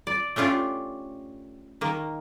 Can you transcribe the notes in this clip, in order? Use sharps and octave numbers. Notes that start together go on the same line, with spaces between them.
D5
A3 C#4 D4 F4 G4
D#3 A#3